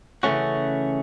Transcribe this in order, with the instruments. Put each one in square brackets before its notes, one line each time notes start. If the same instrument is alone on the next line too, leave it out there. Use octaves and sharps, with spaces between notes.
[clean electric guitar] C#3 E3 A3 C#4 F#4